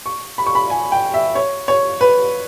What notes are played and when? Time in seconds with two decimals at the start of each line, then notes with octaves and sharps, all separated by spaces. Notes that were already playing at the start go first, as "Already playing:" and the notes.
0.06 C#6
0.38 B5
0.47 C#6
0.55 B5
0.70 G#5
0.92 G5
1.14 E5
1.35 C#5
1.68 C#5
2.01 B4